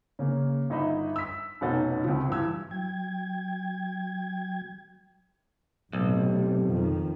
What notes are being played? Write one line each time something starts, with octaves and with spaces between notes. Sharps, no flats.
C#3 A#3
G1 D#4 D#5 E5 B5
E6 B6
F1 B2 C#4 D#4 F#5 A6
C#2 C3 F3
G2 E3 E6 G#6
F#3 G5 G#6
B1 A2 C3 G3
F2 D#3 F3